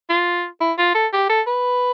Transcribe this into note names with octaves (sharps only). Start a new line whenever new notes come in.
F4
E4
F4
A4
G4
A4
B4